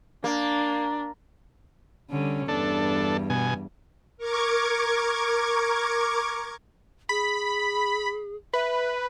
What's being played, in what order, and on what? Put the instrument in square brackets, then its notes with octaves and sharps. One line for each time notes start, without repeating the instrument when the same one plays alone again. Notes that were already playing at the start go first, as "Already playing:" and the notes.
[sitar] A#3 [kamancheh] D4
[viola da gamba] D3 G3 C#4
[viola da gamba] E2 G2 [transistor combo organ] D4 A4
[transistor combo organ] B2 G#5
[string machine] A#4 C#6 D6 G#6
[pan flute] G#4 [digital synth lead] B5
[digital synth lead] B4 [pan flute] E5